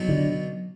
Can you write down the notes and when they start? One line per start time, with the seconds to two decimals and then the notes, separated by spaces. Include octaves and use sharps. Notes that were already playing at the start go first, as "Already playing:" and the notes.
Already playing: B1 B2 F#3
0.09 D3